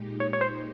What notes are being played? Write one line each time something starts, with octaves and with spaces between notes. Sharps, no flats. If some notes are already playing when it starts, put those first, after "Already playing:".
Already playing: A#2 G#3 D#4 G4
C#5
C#5
C5